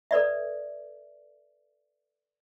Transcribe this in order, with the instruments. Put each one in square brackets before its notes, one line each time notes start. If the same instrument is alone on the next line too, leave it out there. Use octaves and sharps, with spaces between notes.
[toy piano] A4 B4 D5 E5